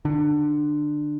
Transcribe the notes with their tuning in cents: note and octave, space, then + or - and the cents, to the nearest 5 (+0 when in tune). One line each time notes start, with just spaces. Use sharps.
D3 +20